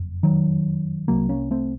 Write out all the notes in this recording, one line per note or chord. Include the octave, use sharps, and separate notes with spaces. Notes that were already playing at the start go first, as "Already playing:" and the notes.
Already playing: F#1 F2
D#3 F#3
C2 C3 F#3 A#3
A#3 C#4
A3 C4